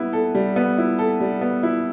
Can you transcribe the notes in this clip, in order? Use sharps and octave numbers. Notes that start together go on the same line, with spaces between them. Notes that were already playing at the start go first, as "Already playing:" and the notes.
Already playing: G3 B3 E4
A4
G3
B3
E4
A4
G3
B3
E4